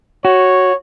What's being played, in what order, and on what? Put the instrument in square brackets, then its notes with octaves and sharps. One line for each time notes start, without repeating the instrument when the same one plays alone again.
[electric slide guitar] F#4 [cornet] C#5